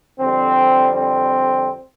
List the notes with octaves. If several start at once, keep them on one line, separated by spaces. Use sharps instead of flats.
F2 D3 G3 C4
C4